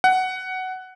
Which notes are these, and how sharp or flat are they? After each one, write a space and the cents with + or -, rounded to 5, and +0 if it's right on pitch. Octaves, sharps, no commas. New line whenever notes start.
F#5 +10